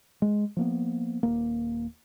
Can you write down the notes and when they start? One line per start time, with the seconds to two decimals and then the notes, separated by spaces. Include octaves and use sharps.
0.22 G#3
0.57 F3 A#3 B3
1.23 D#1 A#3